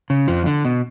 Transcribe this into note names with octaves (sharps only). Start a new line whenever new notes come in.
C#3
F2 F3
D3
B2